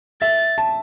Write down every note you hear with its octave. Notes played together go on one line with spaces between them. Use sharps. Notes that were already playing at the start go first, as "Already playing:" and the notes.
E5 A6
A5